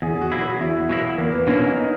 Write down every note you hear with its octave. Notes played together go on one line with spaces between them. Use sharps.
E2 G#4
F#4
B2 F#3 A#3 E4
F#4
E2 E4
B2 F#3 A#3 E4
E2 A#3
B3
B2 F#3 A#3 C#4 E4
D#4
D#4